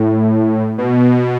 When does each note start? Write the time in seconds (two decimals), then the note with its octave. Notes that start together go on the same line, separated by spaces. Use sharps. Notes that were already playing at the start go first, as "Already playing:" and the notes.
Already playing: A2
0.78 B2